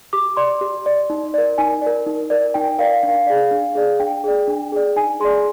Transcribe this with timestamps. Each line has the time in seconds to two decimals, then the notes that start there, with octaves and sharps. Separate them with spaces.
0.13 G4 D6
0.37 D5 C6
0.61 G4
0.86 D5
1.10 D#4
1.34 A#4 D5
1.58 D#4 G#5
1.82 A#4 D5
2.06 D#4
2.30 A#4 D5
2.54 D#4 G5
2.79 A#4 D5 F5
3.03 D4 F5
3.27 G#4 D5
3.51 D4
3.75 G#4 D5
4.00 D4 G5
4.24 G#4 D5
4.48 D4
4.72 G#4 D5
4.96 D#4 G#5
5.20 G#4 D5 C6